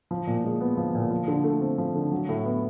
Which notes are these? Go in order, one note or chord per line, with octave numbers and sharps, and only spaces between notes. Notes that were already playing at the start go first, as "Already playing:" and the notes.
F3
A#2
G#3
B3
F3
A#2
F3
D3
A3
C4
F3
D3
F#3
A2
B3